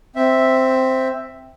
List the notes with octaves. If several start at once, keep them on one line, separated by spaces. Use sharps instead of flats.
C4 E5